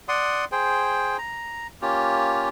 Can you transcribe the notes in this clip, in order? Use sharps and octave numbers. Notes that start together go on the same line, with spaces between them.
D5 F#5 C6 D#6
G#4 C5 G5
A#5
A#3 C#4 F4 G4